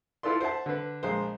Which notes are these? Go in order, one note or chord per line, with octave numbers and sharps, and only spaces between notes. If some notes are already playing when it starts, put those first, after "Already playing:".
E4 F4 A4 B4 D5 C6
C5 E5 F#5 A5
D3 B4
A#1 G#3 C5